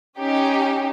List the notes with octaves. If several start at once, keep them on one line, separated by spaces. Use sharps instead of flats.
C#4 D#4 G4